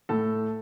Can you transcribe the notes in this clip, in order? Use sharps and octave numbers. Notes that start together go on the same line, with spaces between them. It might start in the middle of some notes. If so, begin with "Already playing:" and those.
A2 A4